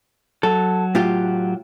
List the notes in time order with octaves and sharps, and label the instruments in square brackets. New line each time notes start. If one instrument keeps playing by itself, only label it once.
[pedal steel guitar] F#3 [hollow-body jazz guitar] A4
[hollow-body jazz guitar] A2 F4 G4